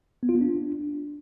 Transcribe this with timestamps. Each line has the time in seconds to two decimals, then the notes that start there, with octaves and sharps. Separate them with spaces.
0.23 B3
0.29 F4
0.35 B3
0.41 D4